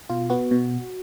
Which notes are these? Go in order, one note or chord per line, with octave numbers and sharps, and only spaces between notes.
B2 F4
B3 F#4
B2